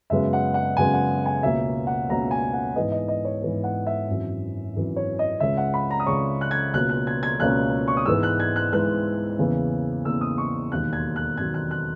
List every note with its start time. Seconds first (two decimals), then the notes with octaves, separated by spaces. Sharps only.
0.10 F#2 C#3 G#3 B3 E5
0.33 F#5
0.54 F#5
0.77 F#2 C#3 G#3 B3 G#5
0.94 F#5
1.26 G#5
1.43 C#2 B2 A#3 C#4 E5
1.87 F#5
2.09 C#2 B2 A#3 C#4 A#5
2.31 G#5
2.54 F#5
2.76 G#2 E3 B3 D#5
2.92 D#5
3.08 D#5
3.25 C#5
3.42 G#2 E3 B3
3.64 F#5
3.87 E5
4.08 G#1 F#2 E3
4.74 G#1 F#2 E3
4.96 C#5
5.19 D#5
5.40 C#2 C#3 G#3 C#4 E5
5.57 F#5
5.74 B5
5.90 A#5
6.00 D#6
6.07 C#2 C#3 G#3 C#4 C#6
6.41 F#6
6.51 G#6
6.73 C#2 B2 A#3 C#4 F#6
6.89 F#6
7.07 G#6
7.23 G#6
7.40 C#2 B2 A#3 C#4 F#6
7.88 C#6
7.97 D#6
8.06 G#2 E3 G#3 B3 E6
8.23 F#6
8.40 G#6
8.56 F#6
8.72 G#2 E3 G#3 B3 F#6
9.38 E2 C#3 E3 A#3
10.05 E2 C#3 E3 A#3 E6
10.21 D#6
10.38 C#6
10.72 E1 D#2 D#3 F#3 F#6
10.93 G#6
11.16 F#6
11.37 E1 D#2 D#3 F#3 G#6
11.54 F#6
11.71 F#6